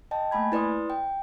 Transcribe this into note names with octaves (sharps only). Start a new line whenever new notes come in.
D#5 G5 A5
A3 A#3 G#5 B5 G#6
E4 B4 D5 C6 D#6
G5